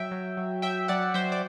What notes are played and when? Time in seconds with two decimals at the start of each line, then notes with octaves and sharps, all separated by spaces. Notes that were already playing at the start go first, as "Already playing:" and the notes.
Already playing: F#3 E5 G5
0.11 F#3
0.37 F#3
0.62 F#3 E5 G5
0.88 F#3 D5 F#5
1.14 F#3 C5 E5
1.32 D5